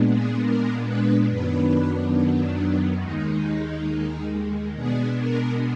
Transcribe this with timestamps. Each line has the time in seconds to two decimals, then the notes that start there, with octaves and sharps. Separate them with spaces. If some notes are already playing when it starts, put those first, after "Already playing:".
Already playing: A#2 G#3 B3 D4
0.12 G#4
0.41 A#4
0.84 B4
1.28 F#2 D#3 F#3 B3 D4 B4
2.15 D4
3.01 D#2 D#3 G#3 D#4
4.75 B2 G#3 B3 D4 G#4
5.19 A#4